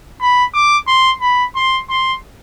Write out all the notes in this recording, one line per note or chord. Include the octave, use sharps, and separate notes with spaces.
B5
D6
C6
B5
C6
C6